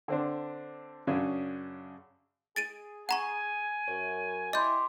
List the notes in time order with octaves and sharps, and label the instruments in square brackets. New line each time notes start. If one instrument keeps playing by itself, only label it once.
[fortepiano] D3 C4 D4
F#2 C#3 C#4 D4
[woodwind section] G#4 [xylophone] A6 D7 D#7
[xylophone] F#5 A#5 C#6 [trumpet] G#5
[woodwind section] F#2 [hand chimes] C#5
[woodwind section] G3 E4 G4 [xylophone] D#5 G6 [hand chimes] B5 C6 D6